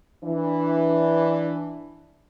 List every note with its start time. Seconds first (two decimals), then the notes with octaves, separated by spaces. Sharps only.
0.24 E3 D4